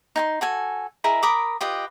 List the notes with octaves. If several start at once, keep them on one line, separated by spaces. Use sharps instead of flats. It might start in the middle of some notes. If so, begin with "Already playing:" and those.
D#4 G#5 C6
F#4 A4 G#5
E4 G#4 A#4 D#5
A#4 B5 D6 D#6
F4 G4 B4 D#5